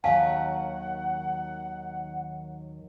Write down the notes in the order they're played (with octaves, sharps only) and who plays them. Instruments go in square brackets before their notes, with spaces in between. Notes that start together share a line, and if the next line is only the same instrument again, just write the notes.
[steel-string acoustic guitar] D#2 D#3 F#3 [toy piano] F5 G#5 A5 [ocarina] F#5